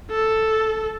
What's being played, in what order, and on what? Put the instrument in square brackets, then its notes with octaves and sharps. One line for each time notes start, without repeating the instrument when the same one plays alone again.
[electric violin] A4